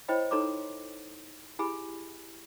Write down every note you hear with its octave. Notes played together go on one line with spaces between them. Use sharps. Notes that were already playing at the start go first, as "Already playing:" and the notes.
E4 C5 C#5 D#5 G5 B5
D#4 A4 C#5 A#5 C6 D6
E4 G4 G#4 G#5 B5